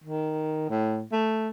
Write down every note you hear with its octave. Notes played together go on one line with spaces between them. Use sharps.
D#3
A2
A3